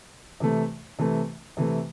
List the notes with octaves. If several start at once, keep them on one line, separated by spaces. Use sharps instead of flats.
C3 E3 A3
C3 E3 A3
C3 E3 A3